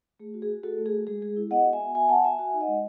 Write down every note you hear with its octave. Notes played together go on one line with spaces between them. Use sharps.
A3 G#4
F#4
G#4
F#4
A3 F#4 A4
A3
G#4
F#4
G#3 G#4
G#3 G#4
E4
B3 D#5 F#5
F#4
E5 G#5
B3
F#4 E5 G#5
B3 F#5 A5
F#4 E5 G#5
F#4 E5 G#5
D#4
D#5 F#5
G#3